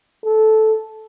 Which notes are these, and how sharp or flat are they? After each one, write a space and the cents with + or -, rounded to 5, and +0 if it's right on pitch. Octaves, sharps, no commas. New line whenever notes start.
A4 -10